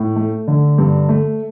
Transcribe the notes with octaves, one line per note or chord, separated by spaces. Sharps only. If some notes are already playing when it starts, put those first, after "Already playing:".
Already playing: A2
A3
D3
G2
A3